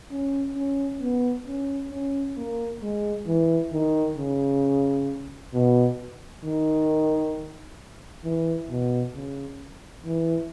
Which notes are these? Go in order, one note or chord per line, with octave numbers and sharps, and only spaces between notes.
C#4
C#4
B3
C#4
C#4
A#3
G#3
E3
D#3
C#3
B2
D#3
E3
B2
C#3
E3